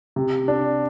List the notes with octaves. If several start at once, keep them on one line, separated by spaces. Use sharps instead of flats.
C3
D4